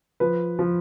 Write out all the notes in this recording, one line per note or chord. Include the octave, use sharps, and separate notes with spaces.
F3 B4
F3